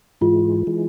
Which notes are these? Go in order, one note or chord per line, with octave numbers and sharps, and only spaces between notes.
G#2 E3 G#3 F4
E3 G#3